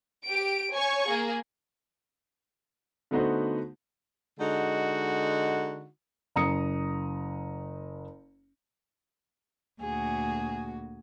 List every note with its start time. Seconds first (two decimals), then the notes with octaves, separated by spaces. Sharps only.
0.25 G4 D7
0.73 C#5 G#5 C#6
1.08 A#3 G#4
3.11 D3 A3 B3 D#4 F#4 C5
4.40 D3 G#3 D#4 F#4
6.36 F#1 A#5 D#6 C#7
9.81 D2 A#2 F#4 G#4